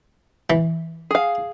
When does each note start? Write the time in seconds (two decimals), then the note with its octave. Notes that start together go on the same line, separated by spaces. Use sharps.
0.50 E3
1.11 G#4 F5